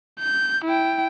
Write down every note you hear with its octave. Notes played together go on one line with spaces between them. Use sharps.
G6
E4 G5